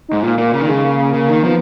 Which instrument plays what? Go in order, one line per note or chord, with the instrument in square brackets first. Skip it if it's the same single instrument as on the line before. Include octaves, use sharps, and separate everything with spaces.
[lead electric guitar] G#2 [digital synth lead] D#4
[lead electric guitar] A#2 [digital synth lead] F4
[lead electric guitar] A#2 [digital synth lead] A#3
[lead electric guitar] C#3 [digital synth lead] A#3
[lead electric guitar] D#3
[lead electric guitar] C#3 [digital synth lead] G#3
[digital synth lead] A#3
[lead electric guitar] C#3
D#3
[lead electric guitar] F3 [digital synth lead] B3